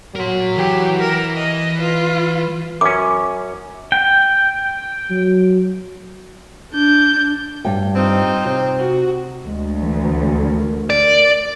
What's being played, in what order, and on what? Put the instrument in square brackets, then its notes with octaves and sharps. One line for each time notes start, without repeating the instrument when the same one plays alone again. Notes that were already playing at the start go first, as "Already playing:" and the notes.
[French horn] F#3 [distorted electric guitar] A#4 C6
[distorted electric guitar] E3 [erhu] G4
[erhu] A#4
D#5
[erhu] F4 [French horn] B4
[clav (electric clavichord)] F#2 C#4 [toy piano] D6
[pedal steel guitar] G5
[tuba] F#3
[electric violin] D4 G6
[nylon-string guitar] G2 G5
[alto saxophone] C4 [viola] D#4 F4
[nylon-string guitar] C3
[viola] F#4
[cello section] D2 [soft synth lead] G#3
[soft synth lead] E3
A#4
[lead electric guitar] D5